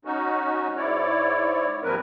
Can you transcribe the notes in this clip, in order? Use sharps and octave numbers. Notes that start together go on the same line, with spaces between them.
C#4 D#4 F#4
G#2 E4 C#5 D5
D#2 G#2 F3 C4 A#4 B4